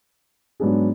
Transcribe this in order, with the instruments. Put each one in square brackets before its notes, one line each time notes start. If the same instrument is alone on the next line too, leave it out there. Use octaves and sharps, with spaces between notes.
[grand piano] G#2 F#3 B3 D4 G#4